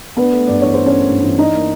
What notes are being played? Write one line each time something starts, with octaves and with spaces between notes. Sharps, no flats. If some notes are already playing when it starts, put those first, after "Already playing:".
B3 D4 B4
A3
G2 D5
E3 C#5
D4 C5
C#4 C#5
A3
G2
E3
D4 D#4 D#5
A#3